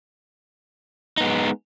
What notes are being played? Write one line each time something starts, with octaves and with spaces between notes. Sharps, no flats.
G#3 B3 D#4